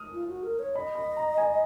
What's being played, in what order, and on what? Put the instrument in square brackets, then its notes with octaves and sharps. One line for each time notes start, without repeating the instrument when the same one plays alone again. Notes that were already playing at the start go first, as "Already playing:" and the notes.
Already playing: [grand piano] D#6 F6
[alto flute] F4
F#4
A#4
C#5
[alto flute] D#5 [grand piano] B5
[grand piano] B5
A#5
G#5